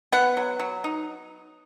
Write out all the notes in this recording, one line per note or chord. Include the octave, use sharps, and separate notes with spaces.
B3 F#5
F#3
F#3
D#4